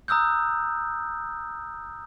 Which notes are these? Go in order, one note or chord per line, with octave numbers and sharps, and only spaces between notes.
A#5 D#6 E6 F#6 G6